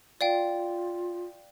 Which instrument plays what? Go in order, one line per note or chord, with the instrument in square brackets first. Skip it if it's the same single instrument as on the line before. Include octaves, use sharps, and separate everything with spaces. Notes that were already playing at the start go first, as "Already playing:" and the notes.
[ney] F4 [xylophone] D5 F5 G5